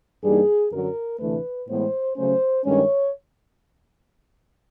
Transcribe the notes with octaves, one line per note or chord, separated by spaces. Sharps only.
G2 E3 G3 A#3 D#4 G#4
F#2 D3 F#3 A#4
D2 C3 E3 A3 D4 B4
A2 E3 G#3 B3 C5
C#3 F#3 A3 C#4 C5
G2 D#3 G#3 C#4 C#5